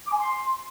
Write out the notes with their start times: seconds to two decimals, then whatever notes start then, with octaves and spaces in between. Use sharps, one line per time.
0.05 D6
0.12 G#5
0.18 C6